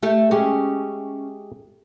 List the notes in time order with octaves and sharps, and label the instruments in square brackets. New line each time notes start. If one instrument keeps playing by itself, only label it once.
[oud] A3 G4 A4
[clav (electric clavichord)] G#3 G4 G#4 [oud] C#4